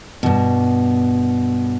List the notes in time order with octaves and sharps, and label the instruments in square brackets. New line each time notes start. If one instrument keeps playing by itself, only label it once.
[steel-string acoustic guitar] G2 B2